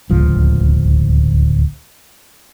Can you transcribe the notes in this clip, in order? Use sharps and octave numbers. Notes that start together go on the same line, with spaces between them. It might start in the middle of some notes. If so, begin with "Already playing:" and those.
D1 G1 C#2 F3